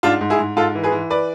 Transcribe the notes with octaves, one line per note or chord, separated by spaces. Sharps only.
G#2 D4 F4
G#2
E4 G#4
G#2
G#2 F4 A4
E3
G#4 B4
E3
B4 D5